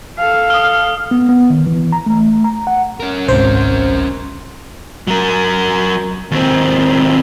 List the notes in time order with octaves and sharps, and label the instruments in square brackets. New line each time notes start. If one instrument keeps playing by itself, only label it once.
[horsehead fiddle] A4 F5
[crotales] D#6 F6
[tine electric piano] B3
B3
D#3
E3
A#5
A3
A#5
F#5
[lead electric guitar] C#4 A#4
[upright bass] G#1 C#2 [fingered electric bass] G#2 C3 [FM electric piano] C5
[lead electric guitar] F#3 A#4
D#2 C4